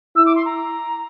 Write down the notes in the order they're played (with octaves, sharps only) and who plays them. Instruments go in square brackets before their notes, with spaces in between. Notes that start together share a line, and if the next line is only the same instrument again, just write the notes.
[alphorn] E4 [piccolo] E6
[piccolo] D6
C6
A#5